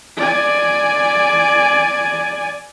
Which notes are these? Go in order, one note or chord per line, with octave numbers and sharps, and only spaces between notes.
D5 G#5